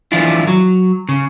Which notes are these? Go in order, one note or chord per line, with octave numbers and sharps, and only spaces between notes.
E3 F3 D4 E4 F4
F#3
C#3